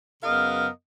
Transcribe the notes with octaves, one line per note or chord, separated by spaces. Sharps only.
F#2 C#3 B3 A#4 D#5 F5